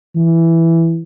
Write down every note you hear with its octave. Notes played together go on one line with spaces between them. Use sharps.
E3